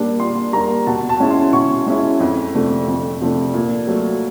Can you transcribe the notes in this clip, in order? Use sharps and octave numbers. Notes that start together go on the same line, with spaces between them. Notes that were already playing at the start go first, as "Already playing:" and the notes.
Already playing: A#2 G3 A#3 D4
A#2 C6
G3 A#3 D4 A#5
B2 A5
A5
G#3 C#4 E4
C6
B2 C#6
G#3 C#4 E4
F2
C3 F3 A3 D4
F2
C3 F3 A3 D4
A#2
F#3 A3